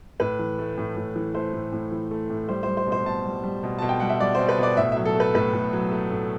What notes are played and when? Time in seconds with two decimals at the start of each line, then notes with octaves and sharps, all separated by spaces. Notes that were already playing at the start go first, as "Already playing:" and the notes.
0.20 A2 B4
0.39 E3
0.58 A3
0.77 A2
0.96 A2
1.16 E3
1.34 A3 C5
1.53 A2
1.72 A2
1.92 E3
2.11 A3
2.30 A2
2.48 G3 C5
2.63 G3 C5
2.77 C5
2.87 B2
2.92 C5
3.06 B2 A5
3.25 G3
3.43 G3
3.63 B2
3.79 B2 A5
3.89 G5
4.00 G3 F#5
4.09 E5
4.20 G3 D5
4.35 B2 C5
4.49 B4
4.58 B2 D5
4.77 A2 E5
4.92 F#3 E5
5.05 A4
5.16 A3 B4
5.34 A2 B4
5.53 A2
5.73 F#3
5.91 A3
6.10 A2